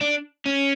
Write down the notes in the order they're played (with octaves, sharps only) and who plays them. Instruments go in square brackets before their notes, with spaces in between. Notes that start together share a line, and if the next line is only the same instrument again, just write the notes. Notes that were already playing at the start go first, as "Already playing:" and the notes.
[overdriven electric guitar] D4
C#4